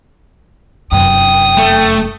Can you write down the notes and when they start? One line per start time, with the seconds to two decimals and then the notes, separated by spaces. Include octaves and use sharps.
0.92 F1 F#2 G5 D#6
1.57 A3